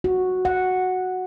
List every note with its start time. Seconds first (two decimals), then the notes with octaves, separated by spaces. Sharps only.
0.04 F#4
0.45 F#5